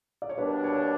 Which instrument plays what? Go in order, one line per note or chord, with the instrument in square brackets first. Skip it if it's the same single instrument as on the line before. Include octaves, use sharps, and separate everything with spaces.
[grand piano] D5
C#5
[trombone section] B2 G3 A#3 D4 [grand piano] B4
[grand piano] C#5